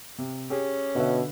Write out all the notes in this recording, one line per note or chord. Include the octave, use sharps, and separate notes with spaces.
C3
C#4 G4 G#4
B2 D3 B4 E5